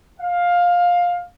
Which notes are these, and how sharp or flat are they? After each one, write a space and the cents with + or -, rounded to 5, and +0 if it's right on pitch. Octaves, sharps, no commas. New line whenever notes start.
F5 +15